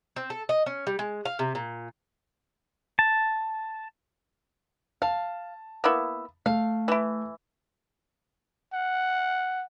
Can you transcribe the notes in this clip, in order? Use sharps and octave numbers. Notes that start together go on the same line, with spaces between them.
C4
A4
D#5
C#4
G3
G#3
F5
C3
A#2
A5
F5 A5
A#3 B3 E4
A3 F5
E3 E4
F#5